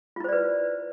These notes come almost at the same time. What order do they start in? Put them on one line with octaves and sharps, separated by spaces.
F4 E4 C5 D5 B4